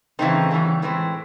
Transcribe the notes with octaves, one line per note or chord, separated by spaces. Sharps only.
C#3 E3 A3 C4 D#4
E2 C#3 E3 G3
A2 E3 G#3 C4